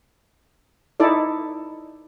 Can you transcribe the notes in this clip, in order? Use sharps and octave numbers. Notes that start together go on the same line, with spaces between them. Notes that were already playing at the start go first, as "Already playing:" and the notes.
D#4 E4 A4 D5